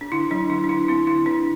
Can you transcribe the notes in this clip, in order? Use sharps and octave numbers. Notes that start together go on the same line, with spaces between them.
D4
D3 E4
F#3 D4
D3 E4
D4
D3 E4
C4 E4
D3 E4
D3 D4